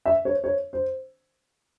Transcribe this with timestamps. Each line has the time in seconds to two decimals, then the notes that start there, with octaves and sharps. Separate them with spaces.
0.05 E5
0.25 C#5
0.44 C#5
0.73 C5